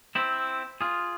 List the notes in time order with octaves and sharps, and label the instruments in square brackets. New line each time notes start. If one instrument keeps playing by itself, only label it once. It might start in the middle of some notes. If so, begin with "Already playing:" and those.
[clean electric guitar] C4 E4
F4 G#4